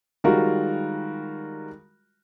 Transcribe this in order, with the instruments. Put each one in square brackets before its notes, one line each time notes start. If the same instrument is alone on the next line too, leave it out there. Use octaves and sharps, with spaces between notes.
[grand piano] D#3 G3 G#3 F4 F#4 A#4